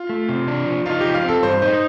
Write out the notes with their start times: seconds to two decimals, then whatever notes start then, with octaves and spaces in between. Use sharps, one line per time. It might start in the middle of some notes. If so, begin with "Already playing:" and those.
Already playing: F4
0.09 A3
0.29 C3
0.48 D4
0.67 F3
0.86 D#4 F4
1.00 G4
1.06 F3
1.15 F5
1.25 C4 A4
1.43 G2 C5
1.62 D#4 C5